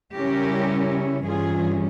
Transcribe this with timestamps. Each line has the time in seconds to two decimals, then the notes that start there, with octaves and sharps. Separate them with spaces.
0.15 C#3 G3 C#4 E4 G4 A#4
1.24 G2 E3 G3 C#4 F4 G#4